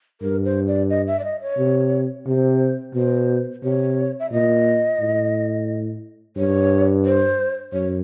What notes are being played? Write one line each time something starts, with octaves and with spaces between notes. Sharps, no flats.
G2 A#4
C5
D5
D#5
E5
D5
D#5
C#5
C3
C3 C5
B2 C5
C3 C#5
E5
A#2 D#5
A2
G2 C#5
C5
F#2 C#5